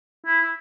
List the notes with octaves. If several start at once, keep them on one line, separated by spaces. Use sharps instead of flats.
E4